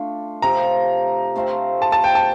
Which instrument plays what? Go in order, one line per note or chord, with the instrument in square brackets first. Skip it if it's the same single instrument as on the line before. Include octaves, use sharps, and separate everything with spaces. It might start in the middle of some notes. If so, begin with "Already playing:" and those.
Already playing: [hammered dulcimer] A3 D4 F4
[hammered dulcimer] C3 F3 C4 [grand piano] A#5
[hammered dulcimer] A3 C4 F4 C5
[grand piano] A5
A5
G5
A5